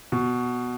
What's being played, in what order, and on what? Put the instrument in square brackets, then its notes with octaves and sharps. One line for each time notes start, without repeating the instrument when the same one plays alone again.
[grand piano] B2